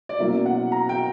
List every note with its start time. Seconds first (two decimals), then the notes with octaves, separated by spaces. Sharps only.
0.09 D5
0.20 B2 F#3 A#3 C#4 E4 E5
0.46 F#5
0.72 A#5
0.89 G5